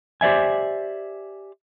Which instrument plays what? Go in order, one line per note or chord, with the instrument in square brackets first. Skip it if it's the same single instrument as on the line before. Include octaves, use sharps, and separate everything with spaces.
[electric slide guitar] G4 C5 D5 E5 G#5